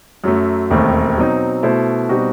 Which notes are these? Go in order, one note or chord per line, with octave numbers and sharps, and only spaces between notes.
F#2 F#3 A3
E1 D#2 D#3 A3 C4
B2 F#3 C4 D#4
B2 A3 E4 A4 C5
B2 G3 C4 D#4 F#4